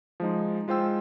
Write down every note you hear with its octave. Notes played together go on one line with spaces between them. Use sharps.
F3 G#3 D#4
G#3 F4 C5 G5 E6